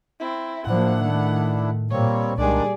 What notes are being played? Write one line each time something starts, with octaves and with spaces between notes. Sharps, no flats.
C4 E4
A2 F3 A#3 D4 E4 F#5
D#3 A3
A#2 G3 A#3 C4 C#5
C2 D#3 G3 G#3 D4 G#4 D5